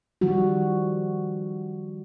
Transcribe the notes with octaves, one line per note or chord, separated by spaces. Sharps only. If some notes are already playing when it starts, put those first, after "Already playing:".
D#3 F3 G3 F#4